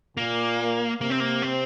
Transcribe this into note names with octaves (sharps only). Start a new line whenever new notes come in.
A#2 A#3
C3 A#3
C4
A#3
C4